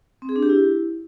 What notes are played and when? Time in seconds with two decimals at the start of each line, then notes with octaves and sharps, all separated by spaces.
0.22 C4
0.29 G#4
0.36 D4
0.43 G4
0.49 E4